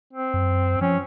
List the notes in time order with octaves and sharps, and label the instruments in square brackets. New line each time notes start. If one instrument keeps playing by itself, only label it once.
[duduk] C4
[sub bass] F#2
[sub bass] F3 [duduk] C#4